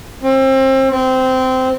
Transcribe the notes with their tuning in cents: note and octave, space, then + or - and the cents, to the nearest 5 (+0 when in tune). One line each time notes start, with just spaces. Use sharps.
C4 +30
C4 -15